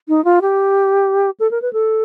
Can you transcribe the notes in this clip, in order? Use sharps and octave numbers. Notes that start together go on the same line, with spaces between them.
D#4
F4
G4
A4
A#4
B4
A4